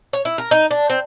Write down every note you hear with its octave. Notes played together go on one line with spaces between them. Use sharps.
C#5
E4
A#4
D#4
D4
C4